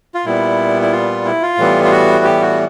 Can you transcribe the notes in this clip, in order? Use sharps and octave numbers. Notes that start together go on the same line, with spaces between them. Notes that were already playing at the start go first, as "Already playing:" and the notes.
F4
A#2 G3 B3 E4
E4
F4
E4
F4
A2 E3 G3 B3
F4
F#4
G4
F#4